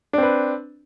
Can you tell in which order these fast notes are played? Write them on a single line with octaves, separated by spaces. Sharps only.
D4 C4 B4